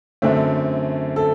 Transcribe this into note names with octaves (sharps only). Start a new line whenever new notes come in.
F#2 D3 A3 C4
A4